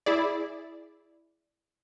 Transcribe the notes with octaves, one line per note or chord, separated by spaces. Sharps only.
E4 G#4 D5